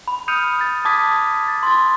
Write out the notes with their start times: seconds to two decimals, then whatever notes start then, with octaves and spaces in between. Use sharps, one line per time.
0.08 B5
0.28 D#6 F6 G6 C#7 D#7 F7
0.59 G6 A6
0.85 A5 D6 D#6 G#6 B6
1.48 A6
1.63 C6 A6